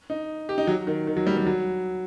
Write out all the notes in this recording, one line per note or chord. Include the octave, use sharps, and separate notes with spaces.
D#4
G4
D#4
F#3
D#3
D#3
F#3
G3
G3
F#3